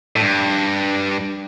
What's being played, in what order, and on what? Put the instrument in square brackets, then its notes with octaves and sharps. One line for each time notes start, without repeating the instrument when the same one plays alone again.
[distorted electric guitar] A2
G2